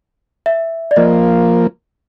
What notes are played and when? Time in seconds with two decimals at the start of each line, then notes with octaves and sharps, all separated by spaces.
0.46 E5
0.91 D5
0.96 F3 A#3 D#5